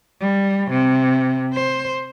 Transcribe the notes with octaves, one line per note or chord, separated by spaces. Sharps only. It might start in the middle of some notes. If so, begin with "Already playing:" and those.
G3
C3
C5